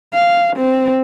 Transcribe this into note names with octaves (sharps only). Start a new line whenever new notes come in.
F5
C4